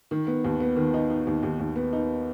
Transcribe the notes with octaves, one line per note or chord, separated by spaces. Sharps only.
D#3
B3
D#2
B3
D#3
D#4
D#4
D#2
D#2
D#2
B3
D#4